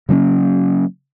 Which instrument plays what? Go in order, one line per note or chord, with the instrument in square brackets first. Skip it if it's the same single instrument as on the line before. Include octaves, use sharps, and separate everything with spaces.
[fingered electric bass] C#3 F#3 A#3 C#4